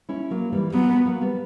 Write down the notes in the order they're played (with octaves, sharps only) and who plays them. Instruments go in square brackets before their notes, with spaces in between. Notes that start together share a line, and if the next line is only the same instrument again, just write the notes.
[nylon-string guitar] C#4 E4
F#3 A#3
E3 G3
[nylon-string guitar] F#3 [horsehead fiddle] B3
[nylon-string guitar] F#3
F#3 A#3
G3 B3